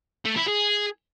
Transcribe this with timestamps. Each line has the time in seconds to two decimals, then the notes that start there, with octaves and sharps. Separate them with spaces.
0.25 A3
0.36 E4
0.48 G#4